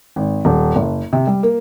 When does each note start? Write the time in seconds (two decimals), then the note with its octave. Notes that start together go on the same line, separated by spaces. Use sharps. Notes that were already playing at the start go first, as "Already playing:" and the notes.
0.16 G#1
0.45 D#1
0.76 F#1
1.13 C3
1.27 G3
1.43 A#3